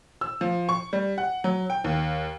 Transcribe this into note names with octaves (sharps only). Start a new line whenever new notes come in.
E6
F3
C#6
G3
F#5
F#3
G5
D#2